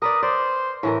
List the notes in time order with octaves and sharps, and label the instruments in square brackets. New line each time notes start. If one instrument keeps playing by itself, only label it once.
[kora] A#4 B4 D5 [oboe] D#6
[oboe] C5 [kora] D5
[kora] A2 E3 A#4